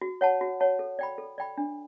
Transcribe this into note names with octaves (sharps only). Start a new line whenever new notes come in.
F#4
C#5 F#5 A5
F#4
C#5 F#5 A5
A4
D5 G5 B5
A4
D5 G5 B5
D4